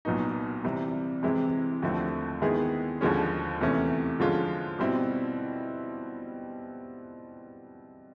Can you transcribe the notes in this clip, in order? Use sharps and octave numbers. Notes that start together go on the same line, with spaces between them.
C2 A#2 F#3 B3 D#4
C3 E3 G3 C4
C3 E3 G#3 C4 E4
D#2 D3 F3 A3 C4
D#3 G#3 B3 E4 G#4
D#2 D3 F3 G#3 C#4
E2 C3 E3 A3 C#4
D3 F3 G#3 C#4 F4
B2 G3 C4 E4